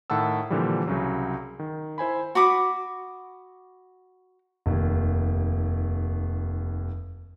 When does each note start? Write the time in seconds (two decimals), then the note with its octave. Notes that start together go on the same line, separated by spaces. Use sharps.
0.10 A2 D#3 F#5 A5 E6
0.50 A#2 D3 E3 F3 G3
0.87 C2 C#3 F#3
1.59 D#3
1.98 E4 C5 G#5 B5
2.35 F#4 B5 D6 D#6
4.66 F1 D#2